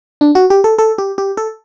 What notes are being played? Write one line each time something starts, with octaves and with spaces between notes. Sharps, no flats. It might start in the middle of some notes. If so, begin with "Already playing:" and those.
D4
F#4
G4
A4
A4
G4
G4
A4